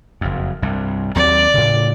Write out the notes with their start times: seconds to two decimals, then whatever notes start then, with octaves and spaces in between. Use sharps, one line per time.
0.21 F#1 F2
0.62 C2 G2
1.15 D#2 F#3 C4 D5
1.54 A2 C#3